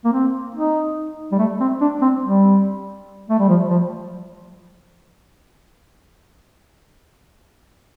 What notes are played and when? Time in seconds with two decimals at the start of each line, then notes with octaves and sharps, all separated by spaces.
0.05 A#3
0.12 C4
0.55 D#4
1.32 G3
1.38 A3
1.60 C4
1.81 D4
2.02 C4
2.23 G3
3.30 A3
3.39 G3
3.48 F3
3.70 F3